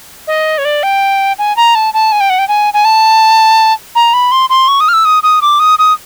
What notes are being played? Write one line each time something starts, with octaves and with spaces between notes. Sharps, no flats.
D#5
C#5
D5
G5
G#5
A#5
A5
A5
G#5
G5
F#5
G5
G#5
G#5
A5
A#5
B5
C6
C6
C#6
D#6
F6
E6
D#6
D#6
D6
D#6
D#6